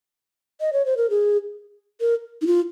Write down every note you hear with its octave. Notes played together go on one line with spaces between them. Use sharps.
D#5
C#5
C5
A#4
G#4
A#4
D#4
F4